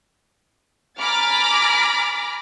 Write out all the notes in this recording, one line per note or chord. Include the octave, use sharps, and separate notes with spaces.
G#5 A#5 B5 D6 F6 A6